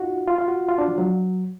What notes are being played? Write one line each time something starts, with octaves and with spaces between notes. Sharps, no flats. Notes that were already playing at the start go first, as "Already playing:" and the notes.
Already playing: D#4 F4 F#4
F4
F4
F#4
F4
D4
F3
F#3